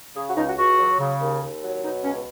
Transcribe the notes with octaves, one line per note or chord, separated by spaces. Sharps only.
C#3 G#4
F#4
C#2 D#4
F#4
C#2 F#4
F#3
C#3
D#2
D#2
F#3
B2 D#4
C#2 C#4